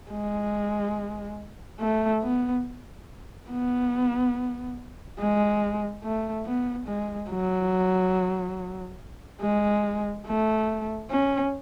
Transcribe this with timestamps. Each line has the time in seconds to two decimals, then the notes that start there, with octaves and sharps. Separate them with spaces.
0.10 G#3
1.79 A3
2.22 B3
3.49 B3
5.18 G#3
6.03 A3
6.46 B3
6.87 G#3
7.29 F#3
9.41 G#3
10.26 A3
11.10 C#4